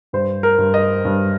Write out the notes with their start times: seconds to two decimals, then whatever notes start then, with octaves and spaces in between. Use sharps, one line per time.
0.13 G2 C5
0.43 A#4
0.58 G2
0.74 D#5
1.05 G2